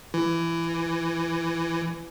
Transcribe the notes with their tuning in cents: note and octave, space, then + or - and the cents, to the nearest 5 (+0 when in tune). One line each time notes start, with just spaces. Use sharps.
E3 +20